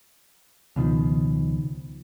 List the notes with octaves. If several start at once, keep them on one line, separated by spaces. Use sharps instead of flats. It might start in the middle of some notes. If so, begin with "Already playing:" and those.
C#2 B2 D#3 F3